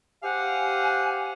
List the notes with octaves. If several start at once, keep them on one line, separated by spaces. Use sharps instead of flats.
G4 C5 F5 F#5 G#5